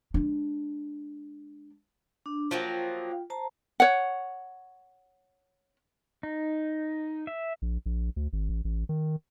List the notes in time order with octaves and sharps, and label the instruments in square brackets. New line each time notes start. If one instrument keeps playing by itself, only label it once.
[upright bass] G#3 D4
[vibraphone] D4
[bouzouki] F3 F#3 A#3 [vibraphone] F4 G5
[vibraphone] C5 A5 A#5
[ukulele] C#5 F#5
[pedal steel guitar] D#4
E5
[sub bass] A#1
A#1
D2
G#1
A1
A1
D#3